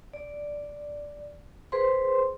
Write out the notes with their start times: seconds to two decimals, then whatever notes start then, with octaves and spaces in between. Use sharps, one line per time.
0.14 D5
1.72 G#4 B4 C5 C6